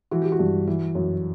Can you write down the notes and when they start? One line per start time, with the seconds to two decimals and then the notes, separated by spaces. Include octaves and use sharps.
0.11 E3 F#4
0.22 G4
0.32 F#4
0.39 G2
0.67 E3
0.95 F#2